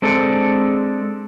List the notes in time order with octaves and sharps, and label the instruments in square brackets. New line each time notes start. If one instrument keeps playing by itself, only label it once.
[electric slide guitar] G#3 C4 D4 A4